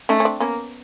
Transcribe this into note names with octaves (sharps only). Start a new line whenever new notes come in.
A3 C#4 D#4
C#4
C4 D4
A#3 B3 C#4